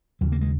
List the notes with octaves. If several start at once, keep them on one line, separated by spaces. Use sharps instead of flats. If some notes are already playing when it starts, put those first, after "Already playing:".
D#2 C#3 F#3
A#3
G#3